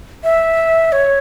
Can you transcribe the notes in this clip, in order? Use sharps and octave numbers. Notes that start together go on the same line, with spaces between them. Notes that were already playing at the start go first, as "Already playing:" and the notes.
E5
C#5